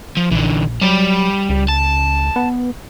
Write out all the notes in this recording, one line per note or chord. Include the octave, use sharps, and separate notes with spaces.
F3
A#1 D3 E3
F#3 G3 G4
C#2
A5
B3